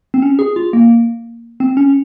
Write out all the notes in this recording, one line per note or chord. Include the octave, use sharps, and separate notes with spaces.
C4
C#4
G#4
F4
A#3
C4
C#4